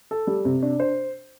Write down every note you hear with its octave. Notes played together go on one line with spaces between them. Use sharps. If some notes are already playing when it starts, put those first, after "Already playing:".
A4
G3
C3
D4
C5